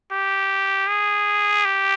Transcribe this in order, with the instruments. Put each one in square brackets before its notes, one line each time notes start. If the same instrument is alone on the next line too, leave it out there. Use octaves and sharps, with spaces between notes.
[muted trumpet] G4
G#4
G4